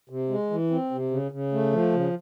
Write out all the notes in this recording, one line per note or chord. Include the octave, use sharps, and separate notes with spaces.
C3
G#3
E3
C4
C3
C#3
C#3
A3
F3
C#3